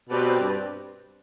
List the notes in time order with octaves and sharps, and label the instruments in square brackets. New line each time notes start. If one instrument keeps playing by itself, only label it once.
[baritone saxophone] B2 [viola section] C4 G4 B4 D5
[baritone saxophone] G2